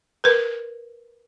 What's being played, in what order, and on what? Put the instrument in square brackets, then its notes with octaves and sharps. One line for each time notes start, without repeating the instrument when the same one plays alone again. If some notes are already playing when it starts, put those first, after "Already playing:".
[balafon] A#4 B4